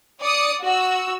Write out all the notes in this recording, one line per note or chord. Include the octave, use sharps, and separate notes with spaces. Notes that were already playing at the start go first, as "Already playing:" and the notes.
D5 D#6 C#7
F#4 E6